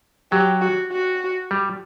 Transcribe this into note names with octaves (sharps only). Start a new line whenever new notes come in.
F#3 G4
F#4
F#4
G3